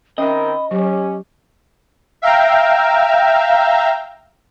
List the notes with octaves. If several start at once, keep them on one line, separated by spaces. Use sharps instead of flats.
D#3 C4 C#4 A#4 D#5 E5 B5
F#3 C#4 G4
E5 F5 G5 A#5